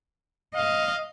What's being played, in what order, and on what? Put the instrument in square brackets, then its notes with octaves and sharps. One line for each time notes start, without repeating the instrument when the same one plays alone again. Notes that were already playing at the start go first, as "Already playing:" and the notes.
[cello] D#5 [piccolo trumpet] F5